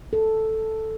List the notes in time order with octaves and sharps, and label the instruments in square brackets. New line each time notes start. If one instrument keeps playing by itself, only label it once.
[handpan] A4